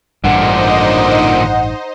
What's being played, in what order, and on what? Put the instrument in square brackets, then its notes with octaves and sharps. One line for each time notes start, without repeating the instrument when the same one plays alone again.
[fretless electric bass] A1 G2 [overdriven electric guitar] A#2 D3 [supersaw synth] D#4 C5 D#5 [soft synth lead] F#5